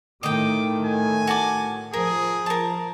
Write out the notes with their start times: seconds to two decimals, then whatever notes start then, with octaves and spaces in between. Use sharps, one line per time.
0.23 A2 D#3 A3 D#5 G5 D6
0.85 G#5
1.27 F#4 A5 D6
1.93 F3 G#4 A#4
2.46 A#4 A5